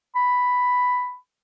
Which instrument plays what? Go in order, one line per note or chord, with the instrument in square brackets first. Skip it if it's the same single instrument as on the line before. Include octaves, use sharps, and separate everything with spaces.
[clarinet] B5